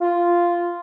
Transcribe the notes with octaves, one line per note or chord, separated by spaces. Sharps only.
F4